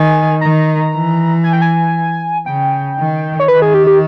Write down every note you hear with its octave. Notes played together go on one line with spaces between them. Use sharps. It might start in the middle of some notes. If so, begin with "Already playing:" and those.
Already playing: D#3 G#5
D#3 A#5
E3
G#5
G5
G#5
C#3 G5
D#3
C#5
D#3 B4
G#4
G4
G4